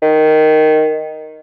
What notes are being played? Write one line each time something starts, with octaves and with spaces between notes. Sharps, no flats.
D#3